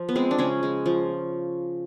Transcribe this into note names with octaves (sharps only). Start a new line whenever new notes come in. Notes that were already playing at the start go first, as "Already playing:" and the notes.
Already playing: F3
B3
G#3 C4
D4
C#3 G#3 C#4
G#3
F3